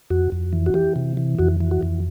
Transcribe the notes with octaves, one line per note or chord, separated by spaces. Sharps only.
F2 F#4
F2
E3
F#4
E3 G4
C3
E3
F2 F#4
E3
F#4
F2